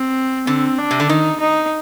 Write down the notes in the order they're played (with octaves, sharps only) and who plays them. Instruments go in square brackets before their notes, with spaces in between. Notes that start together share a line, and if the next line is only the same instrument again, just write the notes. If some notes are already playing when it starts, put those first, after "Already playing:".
Already playing: [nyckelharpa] C4
[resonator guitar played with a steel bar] D3 [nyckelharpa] C4
[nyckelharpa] D4
[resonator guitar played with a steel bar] C3
D3
[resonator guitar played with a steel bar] D#3 [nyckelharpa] D#4
[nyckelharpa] D#4